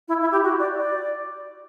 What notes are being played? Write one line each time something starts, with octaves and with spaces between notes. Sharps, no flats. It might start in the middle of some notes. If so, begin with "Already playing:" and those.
E4
E4
G4
F#4
D5
D5